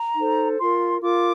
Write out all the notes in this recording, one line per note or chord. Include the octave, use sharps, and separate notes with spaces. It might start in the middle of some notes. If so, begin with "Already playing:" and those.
Already playing: A#5
D#4 A4 C5
F4 A#4 C6
F4 A#4 D6